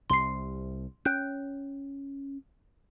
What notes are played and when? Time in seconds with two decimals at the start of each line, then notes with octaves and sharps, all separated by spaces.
0.10 C2 C3 C6 C7
1.05 C#4 G5 F#6 G6